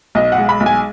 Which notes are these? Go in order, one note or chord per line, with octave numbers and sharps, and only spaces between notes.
B1 D#5
F#5
G#3
B5
B1
G#5